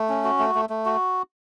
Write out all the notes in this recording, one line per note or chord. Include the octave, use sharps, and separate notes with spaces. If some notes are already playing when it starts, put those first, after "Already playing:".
Already playing: A3
C#4
F#4
A3
A3
A3
F#4